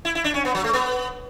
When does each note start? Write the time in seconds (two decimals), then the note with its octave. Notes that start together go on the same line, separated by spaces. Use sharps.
0.05 E4
0.15 E4
0.24 D4
0.34 C#4
0.45 B3
0.55 F#3
0.64 A3
0.73 B3